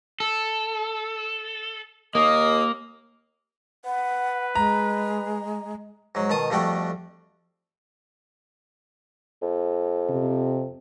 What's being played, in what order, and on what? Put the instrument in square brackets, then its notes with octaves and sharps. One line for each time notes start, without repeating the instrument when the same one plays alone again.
[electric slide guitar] A4
[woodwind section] D#2 D#5 D#6 [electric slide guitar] A#3
[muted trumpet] B4 [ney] F#5
[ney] G#3 [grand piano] A#5
[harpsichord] G#2 F#3
B2 D#3 A5 D#6
F2 G3 A3 F#4 G5
[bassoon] F2
[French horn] C3